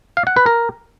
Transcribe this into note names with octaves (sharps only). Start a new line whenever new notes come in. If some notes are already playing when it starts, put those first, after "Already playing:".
F5
F#5
B4
A#4